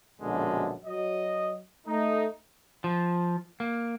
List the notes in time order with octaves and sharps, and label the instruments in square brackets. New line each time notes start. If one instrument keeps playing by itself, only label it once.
[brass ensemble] A#1 F#2 B2 D3 F3 G#3
F#3 D#5
A3 D#4
[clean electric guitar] F3
A#3